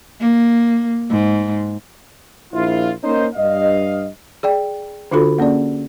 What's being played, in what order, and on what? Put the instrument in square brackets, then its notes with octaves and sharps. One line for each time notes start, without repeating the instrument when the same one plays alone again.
[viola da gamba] A#3
G#2
[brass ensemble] A#1 E4 F4
A#3 C#4 D#4 C5
G2 D#5 F5
[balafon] G#4 D5 G5
D3 D4 F4 F#4 A4 B5
A#3 C#4 G#4 D5